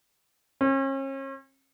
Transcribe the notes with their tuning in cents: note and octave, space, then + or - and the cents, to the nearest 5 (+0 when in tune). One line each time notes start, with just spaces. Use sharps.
C#4 -40